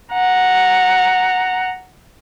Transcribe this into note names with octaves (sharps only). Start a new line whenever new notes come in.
F#5 A#5